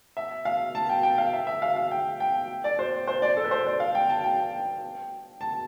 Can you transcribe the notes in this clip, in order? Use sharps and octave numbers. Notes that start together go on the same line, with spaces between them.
E5
F5
A5
G5
G5
F5
E5
E5
F5
F5
G5
G5
D5
C5
C5
D5
A4
B4
C5
D5
F5
G5
A5
G5
A5